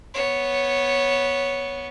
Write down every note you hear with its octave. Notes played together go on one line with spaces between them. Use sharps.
B3 C#5